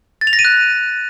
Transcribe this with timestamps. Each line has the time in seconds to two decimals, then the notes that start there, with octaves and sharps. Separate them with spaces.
0.21 A6
0.27 F7
0.33 A#6
0.39 D#7
0.45 F#6